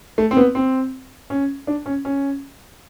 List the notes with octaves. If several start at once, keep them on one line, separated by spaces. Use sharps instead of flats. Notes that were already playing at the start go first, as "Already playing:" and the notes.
A3
C4
B3
C4
C#4
D4
C#4
C#4